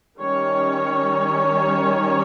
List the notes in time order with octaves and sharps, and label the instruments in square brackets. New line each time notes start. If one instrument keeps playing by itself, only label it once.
[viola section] D#3 G3 C#4 C#5